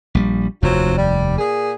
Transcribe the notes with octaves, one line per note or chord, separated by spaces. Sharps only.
A#1 G3
F1 D#2 F#3 C4 F4
G3
A#2 G#4